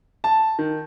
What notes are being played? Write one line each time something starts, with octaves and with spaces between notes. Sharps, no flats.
A5
D#3